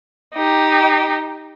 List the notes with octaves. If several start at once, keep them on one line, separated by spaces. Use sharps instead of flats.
D#4 G4